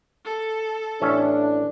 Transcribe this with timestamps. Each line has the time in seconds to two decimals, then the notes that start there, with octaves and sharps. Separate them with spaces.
0.25 A4
1.02 A1 C#4 D4 E5